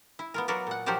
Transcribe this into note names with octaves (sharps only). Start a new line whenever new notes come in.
E4
B3 F4 A#4
F#3 B3 F#4 A#4 B4 D5
A#2 F#5
F3 F#3 G4 A#4 C5 D5